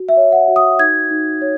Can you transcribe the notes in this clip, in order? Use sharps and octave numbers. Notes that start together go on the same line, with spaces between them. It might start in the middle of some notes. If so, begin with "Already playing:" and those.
Already playing: F#4
E5
C#5
F#5
F#4
D#6
D#4 G#6
D#4
C#5